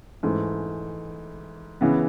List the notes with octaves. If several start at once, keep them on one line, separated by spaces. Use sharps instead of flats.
G#2 E3 A3
C#3 E3 B3